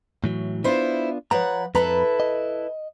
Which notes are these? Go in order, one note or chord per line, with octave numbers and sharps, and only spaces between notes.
A2 E3 F#3
B3 D4 E4 F4 C5
F3 B4 C#5 F#5 A#5
F2 E4 A4 B4 A#5 B5
D#5